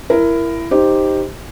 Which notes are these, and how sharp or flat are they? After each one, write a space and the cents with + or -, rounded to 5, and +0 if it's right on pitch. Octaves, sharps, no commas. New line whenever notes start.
E4 +20 A#4 +0
D#4 +0 G4 +0 C5 +0